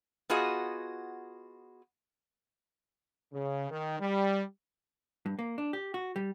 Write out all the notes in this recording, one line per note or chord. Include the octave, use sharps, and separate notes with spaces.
B3 F4 F#4 G#4 D#5
C#3
D#3
G3
G2
A#3
D4
G4
F#4
G3